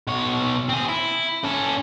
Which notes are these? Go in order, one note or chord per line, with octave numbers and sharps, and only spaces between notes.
B2 C#5
C4 G#4
E4
C#4 A4